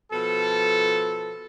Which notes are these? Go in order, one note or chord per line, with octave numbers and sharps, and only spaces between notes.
B2 F3 A4